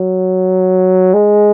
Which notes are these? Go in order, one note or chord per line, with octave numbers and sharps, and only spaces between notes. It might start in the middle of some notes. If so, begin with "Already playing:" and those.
Already playing: F#3
G#3